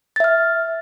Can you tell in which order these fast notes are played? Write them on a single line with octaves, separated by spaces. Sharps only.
A6 E5 F6